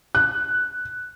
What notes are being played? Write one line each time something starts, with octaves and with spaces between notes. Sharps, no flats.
F#6